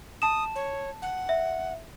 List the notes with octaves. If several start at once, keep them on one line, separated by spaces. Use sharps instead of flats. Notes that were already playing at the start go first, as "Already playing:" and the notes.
A5 D#6 E7
C#5
F#5
E5